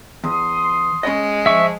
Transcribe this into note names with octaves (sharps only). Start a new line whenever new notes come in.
E2 C6 D#6
G#3 C#4 D#5
F3 E5 C#6